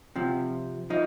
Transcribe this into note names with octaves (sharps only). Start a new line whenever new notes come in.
C3 F3
F3 D#4